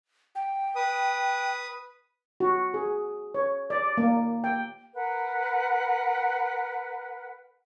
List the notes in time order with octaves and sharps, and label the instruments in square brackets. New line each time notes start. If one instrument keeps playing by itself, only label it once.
[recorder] G5
[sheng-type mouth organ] B4 D#6
[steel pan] F#4
G#4
C#5
D5
A#3
G5
[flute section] A#4 B4 F#5